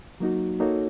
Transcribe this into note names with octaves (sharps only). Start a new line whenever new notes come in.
F#3 A#3 D#4 F#4
A#3 D#4 F#4 A4 C#5